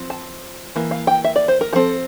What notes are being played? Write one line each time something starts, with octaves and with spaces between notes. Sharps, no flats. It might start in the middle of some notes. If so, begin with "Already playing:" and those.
Already playing: F3 C4
A5
E3 A#3
F5
G5
E5
D5
C5
A#4
F3 C4 A4